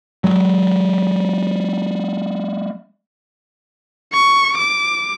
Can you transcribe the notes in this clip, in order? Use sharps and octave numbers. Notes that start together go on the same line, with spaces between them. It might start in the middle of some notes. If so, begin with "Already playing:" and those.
F#3 G#3
C#6
D6